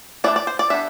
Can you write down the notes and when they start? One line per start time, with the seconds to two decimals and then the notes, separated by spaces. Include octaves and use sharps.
0.24 E3 A3 D4 D5
0.36 D5
0.47 C5
0.59 D5
0.70 G3 B3 D4 E5